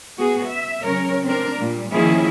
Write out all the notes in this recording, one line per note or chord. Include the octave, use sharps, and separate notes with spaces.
B3 F#4 G#4
E5
C#3 F#3 C#4 A#4 C#5
C4 D4 A#4
A#2 G3
D#3 F3 A#3 C#4 E4 G#4